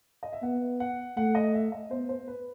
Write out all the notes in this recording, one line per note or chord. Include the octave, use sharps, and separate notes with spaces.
D#5
E5
B3 F#5
F#5
A3 F#5
D#5
E5
D#5
B3 C5
C5
B4